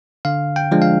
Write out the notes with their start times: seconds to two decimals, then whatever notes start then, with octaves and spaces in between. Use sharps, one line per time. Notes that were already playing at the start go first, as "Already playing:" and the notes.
0.25 D3 F5
0.56 G5
0.71 F3 G#3 D4
0.82 F5